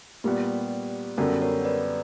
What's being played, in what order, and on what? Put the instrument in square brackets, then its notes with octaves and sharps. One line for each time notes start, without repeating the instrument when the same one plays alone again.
[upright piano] A#2 G3 B3 [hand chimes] G4
[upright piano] F#2 D3 G3 B3 [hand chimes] F#4 A#4
[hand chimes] A#4 C#5
B4 D5